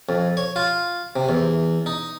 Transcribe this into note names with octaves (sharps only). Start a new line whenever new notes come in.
F2
C#5
F4
C3
E2
D#4